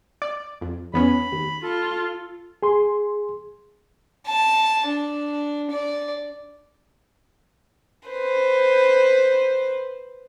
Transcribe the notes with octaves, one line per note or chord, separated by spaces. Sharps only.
D5
F2
E2 B3 C#4 B5
D#2
F4 A4
G#4 C6
A5
D4
D5
B4 C5